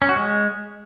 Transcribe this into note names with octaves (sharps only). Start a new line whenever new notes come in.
C#4
F#4
G#3